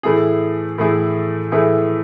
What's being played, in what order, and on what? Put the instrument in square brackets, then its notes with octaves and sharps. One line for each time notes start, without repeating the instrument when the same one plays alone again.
[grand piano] A2 E3 A3 E4 G#4
A2 E3 A3 E4 G#4
A2 E3 A3 E4 G#4